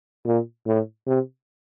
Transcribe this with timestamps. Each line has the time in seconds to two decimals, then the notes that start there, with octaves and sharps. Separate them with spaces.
0.26 A#2
0.66 A2
1.06 C3